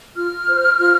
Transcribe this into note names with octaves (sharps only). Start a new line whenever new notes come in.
F4 F6
C5
F4